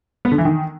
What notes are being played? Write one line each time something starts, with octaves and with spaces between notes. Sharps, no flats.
B3
D3
E3
D#3